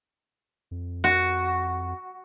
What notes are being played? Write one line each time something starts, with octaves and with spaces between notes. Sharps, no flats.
F2
F#4